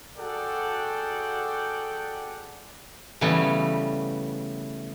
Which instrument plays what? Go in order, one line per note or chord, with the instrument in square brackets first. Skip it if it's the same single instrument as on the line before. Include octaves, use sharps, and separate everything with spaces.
[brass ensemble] F#4 G#4 A4 D5 F#5 G5
[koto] C#3 E3 G3 A3 B3